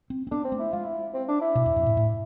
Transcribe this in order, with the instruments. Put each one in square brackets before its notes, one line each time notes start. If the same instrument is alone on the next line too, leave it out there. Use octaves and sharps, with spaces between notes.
[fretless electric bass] C4
C4
[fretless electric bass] B3 [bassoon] D4
[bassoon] C4
[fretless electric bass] A3
[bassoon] E4
[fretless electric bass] G#3 [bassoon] F4
[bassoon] E4
C4
D4
E4
[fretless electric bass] B2
E2
F2
A2
A2